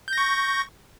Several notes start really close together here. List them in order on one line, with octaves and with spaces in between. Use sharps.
G6 A#6 C#6